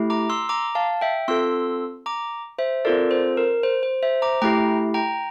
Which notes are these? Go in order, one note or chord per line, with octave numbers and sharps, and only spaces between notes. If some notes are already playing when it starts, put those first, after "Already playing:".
Already playing: A3 E4 G4
A#5 D6
C6 E6
A#5 D6
F5 A5
E5 G5
C4 F4 A4 C6 E6
A#5 D6
C5 E5
C4 F4 A4 A#4 D5
C5
A#4
C5
C5
C5 E5
A#5 D6
A3 E4 G4 G5 A#5
G5 A#5